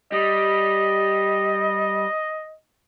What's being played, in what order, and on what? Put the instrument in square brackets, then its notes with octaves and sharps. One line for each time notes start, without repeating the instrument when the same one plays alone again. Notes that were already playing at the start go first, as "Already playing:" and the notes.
[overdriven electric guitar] G3 [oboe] D#5